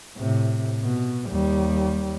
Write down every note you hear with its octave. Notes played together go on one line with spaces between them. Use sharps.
A2 C3
B2
D#2 G3